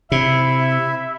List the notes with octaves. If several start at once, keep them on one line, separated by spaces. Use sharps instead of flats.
C3 E4 E5